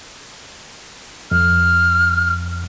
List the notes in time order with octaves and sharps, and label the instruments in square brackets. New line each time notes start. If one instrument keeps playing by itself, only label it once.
[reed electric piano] F2 [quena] F6